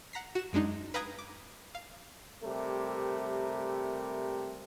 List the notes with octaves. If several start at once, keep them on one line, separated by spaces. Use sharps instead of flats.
F#5 A#5 B6 C7
F#4 E7
F#2 G#3 D4 D#4
B4 F5 G5 A#5 D#6 G#6
D6
F5
C3 G3 A3 A#4